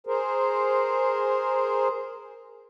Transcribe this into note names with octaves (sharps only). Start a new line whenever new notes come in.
G#4 A#4 C5